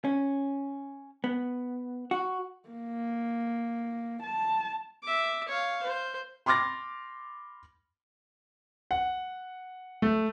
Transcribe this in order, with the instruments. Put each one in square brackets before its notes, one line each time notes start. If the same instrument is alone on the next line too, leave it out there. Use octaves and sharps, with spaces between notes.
[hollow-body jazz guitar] C#4
B3
F#4
[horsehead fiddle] A#3
A5
[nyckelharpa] E5 D6
C#5 F5
C5
[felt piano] B5 C6 D6 F6 A6 A#6
[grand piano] F#5
A3